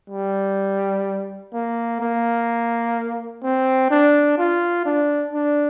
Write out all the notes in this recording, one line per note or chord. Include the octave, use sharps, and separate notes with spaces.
G3
A#3
A#3
C4
D4
F4
D4
D4